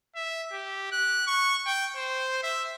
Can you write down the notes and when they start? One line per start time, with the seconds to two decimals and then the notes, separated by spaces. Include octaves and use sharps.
0.16 E5
0.52 G4
0.92 F#6
1.27 C#6
1.66 G5
1.96 C5
2.43 E5